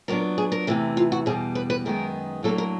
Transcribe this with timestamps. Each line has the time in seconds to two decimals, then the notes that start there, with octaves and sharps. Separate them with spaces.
0.08 A#2 F#3 B3 D4 A#4
0.38 G#4
0.52 A#4
0.67 E2 C3 E3 A3
0.97 F4
1.12 F#4
1.26 E2 B2 G3 G#4
1.55 B4
1.70 B4
1.85 F#2 D#3 G#3 B3 A#4
2.43 A2 F#3 A#3 D4 A4
2.58 A#4